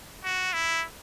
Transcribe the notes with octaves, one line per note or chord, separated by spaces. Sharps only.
F#4
E4